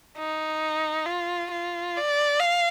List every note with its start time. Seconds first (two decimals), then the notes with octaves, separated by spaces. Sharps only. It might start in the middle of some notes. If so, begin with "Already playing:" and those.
0.18 D#4
1.06 F4
1.51 F4
1.97 D5
2.40 F5